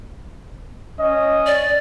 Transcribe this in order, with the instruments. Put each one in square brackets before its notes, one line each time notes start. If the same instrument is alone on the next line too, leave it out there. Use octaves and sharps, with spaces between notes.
[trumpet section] C#4 D#5
[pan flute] D5